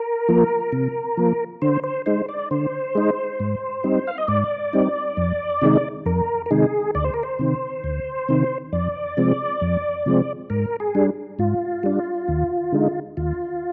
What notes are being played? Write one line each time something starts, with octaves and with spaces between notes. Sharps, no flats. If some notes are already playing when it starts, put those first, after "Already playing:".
Already playing: A#4
F3 A#3
C3
F3 A#3
D3 C5
C5
G#3 D#4 C5
D5
D3 C5
G#3 D#4
G#2
G3 C4 D#4
F5
D#5
G#2 D5
G3 C4 D#4
F2
C3 D#3 G#3 D#4
F2 A#4
A#4
C3 D#3 G#3 D#4 G#4
D2 D5
C5
A#4
C5
C3 D#3
D2
C3 D#3
F2 D5
C3 F3 G#3 C4
F2
C3 F3 G#3 C4
G#2 A#4
G#4
G3 D4
G#2 F4
G3 D4
D#2
D3 G#3 D#4
D#2 F4